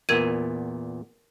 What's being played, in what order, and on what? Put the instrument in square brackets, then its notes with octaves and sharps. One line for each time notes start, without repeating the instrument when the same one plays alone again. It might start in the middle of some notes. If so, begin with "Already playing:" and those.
[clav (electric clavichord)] E2 A#2 B3 [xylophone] A#4 G#6 D#7